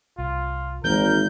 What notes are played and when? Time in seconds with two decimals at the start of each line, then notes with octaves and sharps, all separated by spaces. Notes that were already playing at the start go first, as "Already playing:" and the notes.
0.18 C2 F4
0.84 G#1 D#3 E3 A#3 A#4 G6